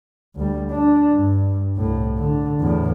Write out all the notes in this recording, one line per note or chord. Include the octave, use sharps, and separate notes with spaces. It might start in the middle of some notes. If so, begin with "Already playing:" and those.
D2 G3
D4
G2
C2 A2
D3
E2 A2